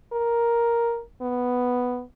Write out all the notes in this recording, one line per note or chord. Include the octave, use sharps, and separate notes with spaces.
A#4
B3